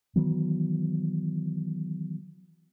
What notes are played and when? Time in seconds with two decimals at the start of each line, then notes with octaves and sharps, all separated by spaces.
0.16 D#3 E3 F#3 B3